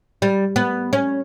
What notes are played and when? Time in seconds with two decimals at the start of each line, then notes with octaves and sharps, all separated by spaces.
0.22 G3
0.56 B3
0.93 C#4